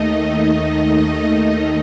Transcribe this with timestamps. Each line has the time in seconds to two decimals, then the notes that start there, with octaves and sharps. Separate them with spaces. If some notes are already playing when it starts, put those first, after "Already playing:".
Already playing: D#2 D#3 A3 D#4 D#5